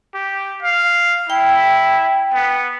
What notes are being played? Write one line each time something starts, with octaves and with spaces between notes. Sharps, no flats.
G4
F5
E4 G5
B3